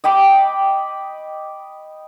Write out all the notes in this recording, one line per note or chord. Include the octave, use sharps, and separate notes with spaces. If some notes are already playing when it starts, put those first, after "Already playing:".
D#5 G5 B5 D6